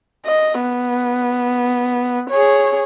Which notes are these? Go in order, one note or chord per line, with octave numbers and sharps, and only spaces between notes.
D#5
B3
G#4 C#5